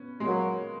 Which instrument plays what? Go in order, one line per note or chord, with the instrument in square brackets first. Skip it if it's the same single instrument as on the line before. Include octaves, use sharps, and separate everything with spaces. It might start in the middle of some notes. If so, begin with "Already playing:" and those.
Already playing: [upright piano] B3 C#4
G#3
[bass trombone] F#3 [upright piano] A#3